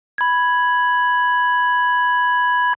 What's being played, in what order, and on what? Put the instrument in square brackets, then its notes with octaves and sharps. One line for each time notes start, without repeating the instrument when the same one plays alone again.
[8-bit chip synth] B5 G#6